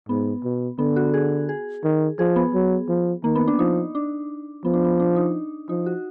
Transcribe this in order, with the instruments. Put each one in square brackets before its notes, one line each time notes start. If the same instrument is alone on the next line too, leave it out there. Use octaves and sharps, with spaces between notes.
[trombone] G#2 [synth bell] B3
[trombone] B2
[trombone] D3 [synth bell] B3
[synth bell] F#4
G#4
G#4
[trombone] D#3
[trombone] F3 [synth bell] G#4
[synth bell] B3
[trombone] F#3
F3
[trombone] D#3 [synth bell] A#3
[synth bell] B3
D4
[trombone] F3 [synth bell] D#4
[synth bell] D4
[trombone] F3 [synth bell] B3
[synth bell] D4
B3
D4
D#4
[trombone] F3 [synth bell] D#4
[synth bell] F#4